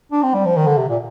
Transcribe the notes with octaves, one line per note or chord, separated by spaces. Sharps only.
D4
C4
G3
F3
D#3
D3
C3
A#2